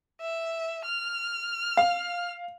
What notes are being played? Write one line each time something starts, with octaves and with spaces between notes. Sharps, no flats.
E5
F6
F5